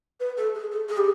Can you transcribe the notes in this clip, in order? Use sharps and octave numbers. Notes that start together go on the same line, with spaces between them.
B4
A4
G#4
A4
G#4
G4